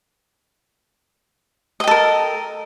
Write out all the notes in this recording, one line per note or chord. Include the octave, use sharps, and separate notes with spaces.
A4 A#4 D#5 G5